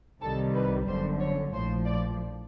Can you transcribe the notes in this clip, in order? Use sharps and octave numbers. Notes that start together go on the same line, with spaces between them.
C2 C3 D#3 G3 A4
B4
G1 F#2 D3 C5
C#5
A#1 A2 F3 C5
D5